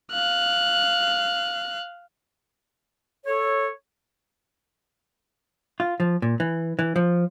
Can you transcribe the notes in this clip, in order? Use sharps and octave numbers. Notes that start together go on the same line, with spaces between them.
F5 F#6
A4 C#5
F4
F3
A#2
E3
E3
F3